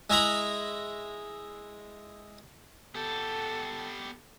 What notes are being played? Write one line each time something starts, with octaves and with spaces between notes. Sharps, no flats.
G#3 E4 A#5 B5
B3 G4 A4